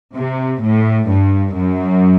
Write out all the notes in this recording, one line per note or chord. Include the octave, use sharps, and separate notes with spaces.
C3
A2
G2
F#2